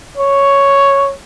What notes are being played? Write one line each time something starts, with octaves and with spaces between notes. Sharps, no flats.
C#5